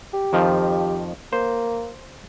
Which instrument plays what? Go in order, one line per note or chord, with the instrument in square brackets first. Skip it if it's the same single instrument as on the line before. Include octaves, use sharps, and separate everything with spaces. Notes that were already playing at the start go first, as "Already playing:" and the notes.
[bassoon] G4
[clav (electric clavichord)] F2 D#3 F3
[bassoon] A#3 [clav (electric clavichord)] C5